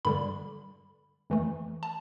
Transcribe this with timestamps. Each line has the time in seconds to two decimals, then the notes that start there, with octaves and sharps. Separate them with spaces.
0.05 G2 D3 G3 B5
1.30 F2 E3 A3
1.83 A5